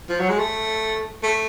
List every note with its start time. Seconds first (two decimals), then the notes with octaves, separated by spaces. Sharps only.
0.09 F3
0.20 F#3
0.29 G#3
0.39 A3
1.23 A3